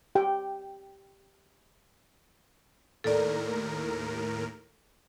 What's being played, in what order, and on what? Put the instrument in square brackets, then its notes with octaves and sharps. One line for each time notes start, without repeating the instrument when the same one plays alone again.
[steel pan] G4 G5
[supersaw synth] D#2 A2 A#4 [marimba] A4 D5